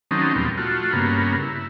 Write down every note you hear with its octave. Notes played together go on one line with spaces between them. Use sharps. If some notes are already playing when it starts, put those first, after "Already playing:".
D#3 F#3 A3 C4 C#4 D#4
D#2 A#2 F3 G3 B3
A3 F4 F#4
G2 C#3 A#3 B3
E4